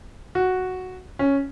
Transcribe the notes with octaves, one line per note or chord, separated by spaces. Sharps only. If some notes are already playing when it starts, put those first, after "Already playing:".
F#4
C#4